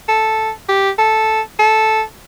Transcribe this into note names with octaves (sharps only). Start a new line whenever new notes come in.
A4
G4
A4
A4